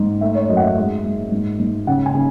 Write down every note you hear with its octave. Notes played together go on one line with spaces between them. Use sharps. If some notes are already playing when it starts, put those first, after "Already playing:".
Already playing: G#2
A3 E5
C#5
F#2 D#5
F#5
E5
G#3
G#3
G#2
G#2
C#3 F#5
G#5
C#3